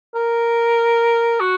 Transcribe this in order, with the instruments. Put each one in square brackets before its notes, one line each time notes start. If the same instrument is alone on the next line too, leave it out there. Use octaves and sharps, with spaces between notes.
[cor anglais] A#4
F#4